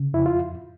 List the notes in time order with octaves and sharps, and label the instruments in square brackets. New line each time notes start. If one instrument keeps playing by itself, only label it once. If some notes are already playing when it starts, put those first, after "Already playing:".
Already playing: [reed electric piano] C#3
F2 E4
F4